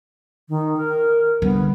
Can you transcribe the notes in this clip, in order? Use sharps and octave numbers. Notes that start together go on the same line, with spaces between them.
D#3
A#4
D3 G3 B3